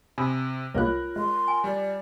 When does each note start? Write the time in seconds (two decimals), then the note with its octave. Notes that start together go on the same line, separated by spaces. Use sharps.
0.18 C3 G#5 B5 D#6
0.75 C2 G#3 A#3 F4 A#4 C#5 F#6
1.16 G#3 C6
1.48 G#5
1.64 G3 D5